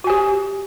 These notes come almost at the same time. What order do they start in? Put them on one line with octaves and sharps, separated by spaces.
F#4 G#5 G4